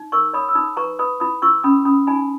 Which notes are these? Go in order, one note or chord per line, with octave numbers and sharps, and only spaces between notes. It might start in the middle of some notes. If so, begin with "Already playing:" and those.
Already playing: D#4
A#4 C#6 E6
C#5 B5 D#6
E6
D#4 B5 D#6
B4 A#5 C#6
B4 B5 D#6
E4 B5 D#6
E4 C#6 E6
C#4 B5 D#6
C#4 B5 D#6
D#4 G#5 B5